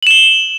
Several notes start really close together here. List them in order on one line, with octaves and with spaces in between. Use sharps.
F#7 E7 G7